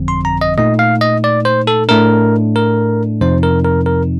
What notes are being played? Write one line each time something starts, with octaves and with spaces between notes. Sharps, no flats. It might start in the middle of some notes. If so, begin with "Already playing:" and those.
Already playing: G1 F2 D3 F3 C4
C6
A#5
D#5
A#2 A3 D#4 D#5
F5
D#5
D5
C5
A4
A2 A3 D4 A#4
A#4
F2 C3 F3 C4 D#4 C5
A#4
A#4
A#4